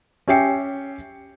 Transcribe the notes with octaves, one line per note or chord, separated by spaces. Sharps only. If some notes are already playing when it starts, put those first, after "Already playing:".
C#4 G4 E5 G5 C7 C#7